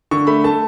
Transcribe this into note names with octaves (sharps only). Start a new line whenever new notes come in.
D3 C#6
A3 B5
A3 A5